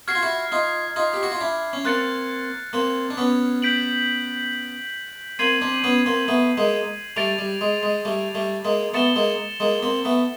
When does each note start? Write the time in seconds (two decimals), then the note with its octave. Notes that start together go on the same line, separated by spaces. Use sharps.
0.08 F#4 F6 G#6 C7
0.15 F4
0.23 E4 F#4
0.52 D#4 F4
0.96 D#4 F4
1.14 G4
1.23 F#4
1.32 F4
1.41 D4 E4
1.73 C#4
1.85 A#3 C4 F#6 A6 C#7
2.73 A#3 C4
3.10 D4
3.17 B3 C#4
3.62 G6 B6 D7 F#7
5.39 A#3 C4 G#6 C7 D#7 F#7
5.62 C4 D4
5.84 B3 C#4
6.06 A#3 C4
6.28 A3 B3
6.57 G#3 A#3
7.16 G3 A3 A6 D7 F7
7.39 G3
7.61 G#3
7.83 G#3
8.05 G3 A3
8.35 G3 A3
8.65 G#3 A#3
8.94 A3 B3 A6 C#7 E7 G7
9.16 G#3 A#3
9.60 G#3 A#3
9.83 A#3 C4
10.05 A3 B3